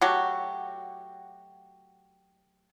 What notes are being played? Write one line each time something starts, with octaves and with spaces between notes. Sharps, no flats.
F#3 A3 F#4 G4